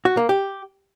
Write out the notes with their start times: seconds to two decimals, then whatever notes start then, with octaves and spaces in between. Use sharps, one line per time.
0.05 F#4
0.17 A#3
0.29 G4